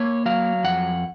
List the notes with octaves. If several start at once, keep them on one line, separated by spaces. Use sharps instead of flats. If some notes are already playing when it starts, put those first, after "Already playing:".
Already playing: A#3 C#5
F#3 F5
F2 F#5